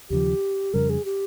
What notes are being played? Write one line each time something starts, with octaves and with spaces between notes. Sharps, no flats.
D#2 C#3 F3 G4
F2 C#3 G3 A#4
G#4
G4